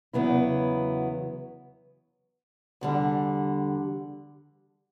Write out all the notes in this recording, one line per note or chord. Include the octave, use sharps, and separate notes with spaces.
E2 C#3 F#3 B3 E4
E2 D3 G3